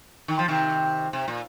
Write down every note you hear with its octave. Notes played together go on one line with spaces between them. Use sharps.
D#3
F3
C3 D#3
C3
A#2